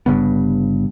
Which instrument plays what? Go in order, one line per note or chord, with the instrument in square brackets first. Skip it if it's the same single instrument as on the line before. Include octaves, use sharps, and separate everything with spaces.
[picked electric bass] G1 G2 C#3 B3